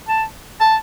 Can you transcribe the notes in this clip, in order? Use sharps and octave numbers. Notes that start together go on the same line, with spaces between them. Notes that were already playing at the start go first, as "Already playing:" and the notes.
A5
A5